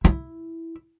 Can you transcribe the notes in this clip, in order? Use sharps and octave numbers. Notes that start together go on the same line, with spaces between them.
E4